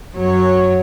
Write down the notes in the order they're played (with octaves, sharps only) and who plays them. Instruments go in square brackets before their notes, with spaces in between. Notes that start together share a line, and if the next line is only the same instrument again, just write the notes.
[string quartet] F#2 F#3 C#5